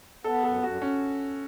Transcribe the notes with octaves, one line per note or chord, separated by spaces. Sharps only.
B3 A4
F#2 A4
F#2 F#4
C#4